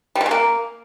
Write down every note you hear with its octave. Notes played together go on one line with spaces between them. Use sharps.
G3
B2
C#3
A#3